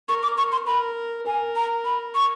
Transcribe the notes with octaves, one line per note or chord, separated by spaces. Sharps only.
A#4 C#6
D6
C#6
C6
A#4 B5
A#4 G#5
A#5
B5
C#6